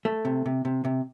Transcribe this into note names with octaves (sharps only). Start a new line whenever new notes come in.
A3
C3
C3
C3
C3